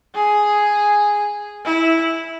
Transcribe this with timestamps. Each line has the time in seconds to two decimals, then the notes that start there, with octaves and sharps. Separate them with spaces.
0.15 G#4
1.65 E4